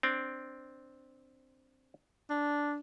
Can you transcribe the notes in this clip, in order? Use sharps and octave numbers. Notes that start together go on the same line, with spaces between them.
C4 D4
D4